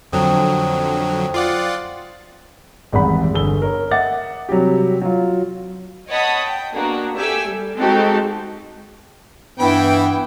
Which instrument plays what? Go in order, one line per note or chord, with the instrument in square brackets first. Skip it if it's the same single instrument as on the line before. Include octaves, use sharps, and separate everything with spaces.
[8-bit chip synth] F2 D3 F#3 [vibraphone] C5 G5 D#6
[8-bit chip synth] F4 D5 F#5
[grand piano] G#1 E2 G#2 G3 F#5 B5
G1 G#4 E6 G7
A#4 C#5
D#5 E5 F#5 D6 A6
C3 F#3 G3 G4
F#3 F4
[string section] C#5 D#5 F#5 A5 B5 D#6
G5
A#3 B3 D4 F#4
G4 A4 D5 E5 G#5 E6
G3
G#3 C4 D#4 F#4 G4 A4
[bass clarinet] G2 [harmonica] E3 B5 [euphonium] B3 [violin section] E4 G5